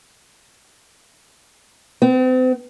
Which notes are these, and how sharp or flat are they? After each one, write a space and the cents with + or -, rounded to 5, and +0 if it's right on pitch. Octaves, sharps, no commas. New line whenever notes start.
C4 -40